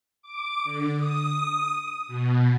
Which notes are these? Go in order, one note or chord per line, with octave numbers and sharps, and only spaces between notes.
D6
D3
D#6
B2